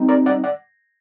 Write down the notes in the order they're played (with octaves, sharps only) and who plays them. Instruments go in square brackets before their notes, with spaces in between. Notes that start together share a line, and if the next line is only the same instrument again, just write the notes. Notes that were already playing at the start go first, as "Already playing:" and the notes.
Already playing: [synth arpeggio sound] G3 C4 D#4
[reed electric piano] A#4 D5
D5 F#5
D5 F#5